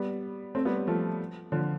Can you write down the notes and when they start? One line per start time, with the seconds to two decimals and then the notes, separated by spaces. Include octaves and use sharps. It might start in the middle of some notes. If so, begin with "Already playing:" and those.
Already playing: G3 B3
0.55 A3 C4
0.65 G3 B3
0.87 F3 A3
1.52 D3 F3